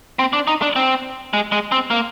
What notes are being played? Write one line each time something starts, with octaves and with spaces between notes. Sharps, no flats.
C4
D4
D#4
D4
C4
G#3
G#3
C4
A#3